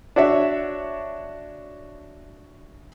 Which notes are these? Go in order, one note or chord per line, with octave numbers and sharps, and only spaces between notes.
D4 F#4 C#5 E5